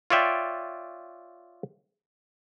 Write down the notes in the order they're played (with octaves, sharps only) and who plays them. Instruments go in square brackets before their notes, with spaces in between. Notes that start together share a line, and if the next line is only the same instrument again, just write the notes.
[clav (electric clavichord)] F4 C#5 D5 E5 G5